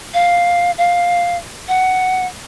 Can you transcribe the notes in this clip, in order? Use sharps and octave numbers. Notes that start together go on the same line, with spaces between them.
F5
F5
F#5